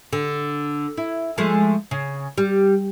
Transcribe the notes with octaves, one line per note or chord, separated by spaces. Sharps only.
D3
E4
F3 G#3 A3
C#3
G3